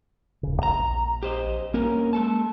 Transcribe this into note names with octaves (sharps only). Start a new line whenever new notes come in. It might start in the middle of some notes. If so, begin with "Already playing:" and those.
D#1 C#3
A#1 A#5
G4 C5 D#5
G2 A#3 C#4 A#4
G#3 A4 A5